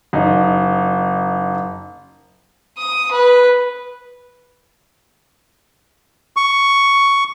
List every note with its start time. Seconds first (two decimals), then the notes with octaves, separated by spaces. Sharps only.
0.13 F#1 D#4
2.78 D#6
3.12 B4
6.37 C#6